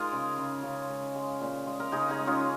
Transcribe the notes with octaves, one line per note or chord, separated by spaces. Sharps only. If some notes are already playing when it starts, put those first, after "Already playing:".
Already playing: G#3 D#4 F4 G#4 A#4
C#3
C#3
C#3
G#3
G#3
A#2
G#3
A#4
C#3 D#4 G#4
D#4 G#4
G#3
C#4 F4